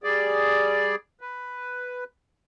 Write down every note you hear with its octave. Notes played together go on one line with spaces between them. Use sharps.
G3 G#4 D5
B4